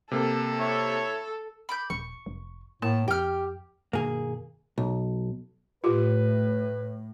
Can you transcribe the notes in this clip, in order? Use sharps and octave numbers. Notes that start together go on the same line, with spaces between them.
C3 A#3 A4
E4 C#5
B5 D6 G6
D#1 C#6
F1
A2 A#3 A5
F2 G4 G5 F6
G2 B2 D#3 A#3 G#4
B1
A2 F4 G4 B4